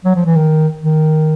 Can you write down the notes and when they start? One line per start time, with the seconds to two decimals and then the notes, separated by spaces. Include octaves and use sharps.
0.05 F#3
0.15 F3
0.26 E3
0.36 D#3
0.81 D#3